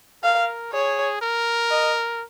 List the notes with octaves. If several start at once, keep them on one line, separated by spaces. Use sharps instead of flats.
A#4 F5
G#4 C#5
A#4
D#5